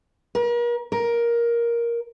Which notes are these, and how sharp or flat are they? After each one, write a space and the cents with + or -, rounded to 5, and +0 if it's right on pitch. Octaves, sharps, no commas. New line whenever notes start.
A#4 +40
A#4 +10